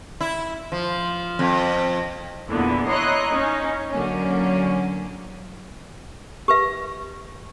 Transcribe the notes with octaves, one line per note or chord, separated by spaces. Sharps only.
E4
F3
F2
E2 A#2 D3 E3 B3
E4 C#5 D#5 A#5 C6 F#6
C#4 D#4
D3 F#3 A#3 C#4
G4 B4 E5